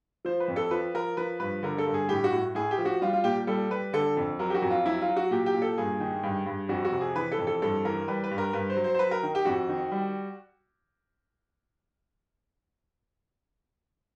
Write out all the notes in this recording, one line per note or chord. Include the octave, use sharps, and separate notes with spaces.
F3 C5
B4
F2
A4
F3 B4
F3 A#4
F3 B4
G2 B4
D3 A#4
A4
G2
G#4
A2 G4
F#4
A2
A2 G#4
G4
F3
F#4
G3 F4
F4
A#2 G4
G3 A4
G3 B4
D3 A4
F2
F#3 A#4
G4
F#4
F2
F4
F#3 E4
F4
F#3
F#4
A#2 G4
G4
A#2
A4
G2 G#4
D#3
G2
G2
F2 F#4
F#4
C3
G#4
E3 B4
A4
F2
A4
G2 A4
E3 A#4
G3 B4
B4
G2
A#4
G2 B4
C5
F#3
C5
C5
F#3 B4
A#4
D#3
G4
F2 F#4
D#3
G3